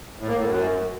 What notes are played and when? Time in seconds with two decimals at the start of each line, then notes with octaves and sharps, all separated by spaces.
0.19 A2
0.28 A#3
0.37 A2
0.46 F#2